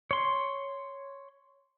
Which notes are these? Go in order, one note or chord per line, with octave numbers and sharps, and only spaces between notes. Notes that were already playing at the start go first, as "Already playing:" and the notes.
C#5 C6